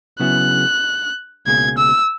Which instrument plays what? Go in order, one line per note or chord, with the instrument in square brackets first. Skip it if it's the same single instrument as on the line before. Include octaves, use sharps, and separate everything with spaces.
[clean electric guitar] C#3 F#3 B3 E4 G#4 [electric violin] F#6
[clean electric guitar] C#2 B2 A#3 C#4 G#4 [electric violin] G#6
[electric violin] E6